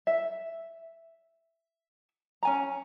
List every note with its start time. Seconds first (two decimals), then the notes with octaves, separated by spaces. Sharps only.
0.07 E5
2.43 C#4 G#5 A#5